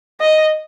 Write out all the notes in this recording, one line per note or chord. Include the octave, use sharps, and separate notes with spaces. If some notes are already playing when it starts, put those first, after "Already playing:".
D#5